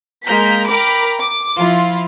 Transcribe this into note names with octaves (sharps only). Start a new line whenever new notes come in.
G#3 A#3 A#5 G6 B6
A#4 G5 A#5 B5 D6
D6
F3 E4 F4